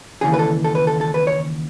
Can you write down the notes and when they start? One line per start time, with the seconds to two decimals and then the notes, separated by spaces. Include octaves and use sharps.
0.21 D#2 C#3 E3 G#4
0.34 B4
0.39 A4
0.64 A4
0.75 B4
0.87 A4
1.01 A4
1.14 B4
1.27 C#5